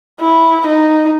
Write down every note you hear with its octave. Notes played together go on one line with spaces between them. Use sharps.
E4
D#4